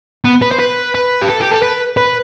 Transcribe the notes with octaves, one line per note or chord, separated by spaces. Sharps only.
B3
B4
C5
B4
B4
G4
A4
G4
A4
B4
B4